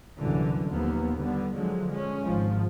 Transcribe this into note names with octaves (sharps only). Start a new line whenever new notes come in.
C2 F#2 A#2 D3 E3
D#2 F3 A#3 B3
D3 G3 B3
D3 F3 F#3 G#3
G#3 C#4
G#1 G#2 F3